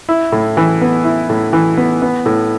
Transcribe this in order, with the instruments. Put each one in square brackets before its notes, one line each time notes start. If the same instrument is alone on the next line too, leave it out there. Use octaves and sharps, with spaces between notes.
[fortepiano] E4
A2
E3
B3
E4
A2
E3
B3
B3
A2